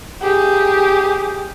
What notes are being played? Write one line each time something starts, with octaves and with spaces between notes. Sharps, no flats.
G4 G#4